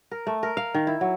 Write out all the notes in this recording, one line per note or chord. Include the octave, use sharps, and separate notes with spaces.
A#4
A3
A#4
F5
D#3
E4
F#3